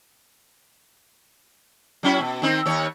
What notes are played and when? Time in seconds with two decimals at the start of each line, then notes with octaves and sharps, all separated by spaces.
2.03 F#3 C#4 E4
2.21 B2
2.42 D#3 C4 D#4
2.66 D#2 C#5